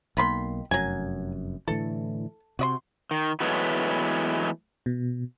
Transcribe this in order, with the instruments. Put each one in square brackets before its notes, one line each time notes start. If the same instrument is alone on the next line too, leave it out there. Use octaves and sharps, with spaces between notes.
[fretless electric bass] B1 A#3 [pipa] D#3 B5 C6
[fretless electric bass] F1 F#2 [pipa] F#3 G#5
[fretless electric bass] A2 D3 E3 [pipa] A4
[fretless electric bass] C3 [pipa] F#4 D#5 C6
[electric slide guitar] D#3
E3 F#3 G#3 A3 B3
[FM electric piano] B2